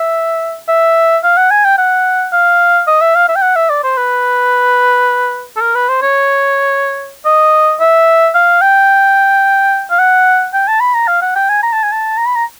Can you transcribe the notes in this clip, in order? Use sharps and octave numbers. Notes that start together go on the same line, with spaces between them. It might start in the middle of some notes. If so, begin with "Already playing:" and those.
Already playing: E5
E5
F5
F#5
G#5
G5
F#5
F5
D#5
E5
F5
E5
G5
F#5
E5
D5
C5
B4
A4
A#4
B4
C5
C#5
D#5
E5
F5
G5
F5
F#5
G5
A5
B5
A#5
F5
F#5
G5
G#5
A#5
A5
G#5
A5
A#5
B5
A#5